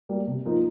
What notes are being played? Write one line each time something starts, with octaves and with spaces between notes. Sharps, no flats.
G3 A#3
C3
F3 A#3 D#4